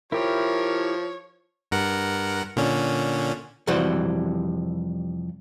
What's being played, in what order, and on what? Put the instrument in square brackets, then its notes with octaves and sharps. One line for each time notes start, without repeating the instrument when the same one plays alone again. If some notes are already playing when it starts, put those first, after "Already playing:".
[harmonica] F3 [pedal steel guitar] E4 G4 [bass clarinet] A#4 [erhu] C#5
[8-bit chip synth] G2 A#4 F#5
A#2 D3 C#4
[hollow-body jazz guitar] F2 C3 E3 G3 F#4 C5